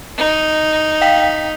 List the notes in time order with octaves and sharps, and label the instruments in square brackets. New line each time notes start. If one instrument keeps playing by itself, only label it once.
[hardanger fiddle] D#4
[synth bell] F5 G5 B6